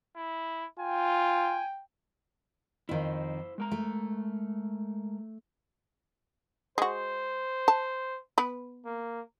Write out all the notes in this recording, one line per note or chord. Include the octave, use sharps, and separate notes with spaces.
E4
F4 G5 G#5
F2 D#3 E4 C5
G#3 A#4 A#5
A3
G#3 F#4 C5
A5
B3 B4
A#3